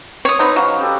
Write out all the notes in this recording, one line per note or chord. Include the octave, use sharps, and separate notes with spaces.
C#5 D#6
B3 C4 D#4 B4
F#3 C#4 D#5 F5
C#4 G4 A4